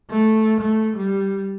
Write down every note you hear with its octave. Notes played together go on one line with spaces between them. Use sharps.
A3
A3
G3